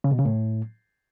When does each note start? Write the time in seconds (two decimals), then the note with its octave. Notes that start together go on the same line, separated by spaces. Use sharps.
0.04 C#3
0.11 B2
0.18 C#3
0.25 A2